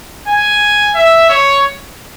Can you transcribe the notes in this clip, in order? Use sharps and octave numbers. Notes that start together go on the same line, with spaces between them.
G#5
E5
C#5